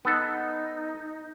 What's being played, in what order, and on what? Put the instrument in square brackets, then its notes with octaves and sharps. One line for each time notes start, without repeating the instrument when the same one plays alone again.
[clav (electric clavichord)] B3 A4 [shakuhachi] D#4